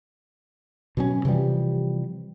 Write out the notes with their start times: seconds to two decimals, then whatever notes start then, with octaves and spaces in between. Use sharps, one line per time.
0.97 B2 F#3 C#4
1.25 C3 E3 F3 G3